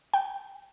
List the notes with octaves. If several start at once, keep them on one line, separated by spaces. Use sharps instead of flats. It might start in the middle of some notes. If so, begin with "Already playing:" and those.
G5